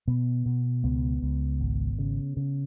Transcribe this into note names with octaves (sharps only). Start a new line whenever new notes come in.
B2 B3
B2
C#2 B3
C#2
G#1
C#3
C#3